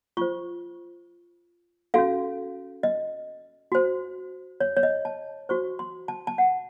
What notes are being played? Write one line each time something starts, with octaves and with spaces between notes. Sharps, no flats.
F4 C5 C#6
C#4 F#4 A4 F5
D#5
F#4 C5
C#5
C#5
D#5
A5
F#4 C5 C#6
C6
A5
A5
F#5